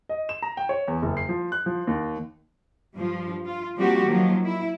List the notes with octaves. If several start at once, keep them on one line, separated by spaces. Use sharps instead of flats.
D#5
E7
A#5
G5
C#5
E2
F#1
C7
F3
F#6
F3
D#2
G2 F3
F4
F3 G3 A#3 C4 F#4 G4
D#3 F3 F#3 A#3
E4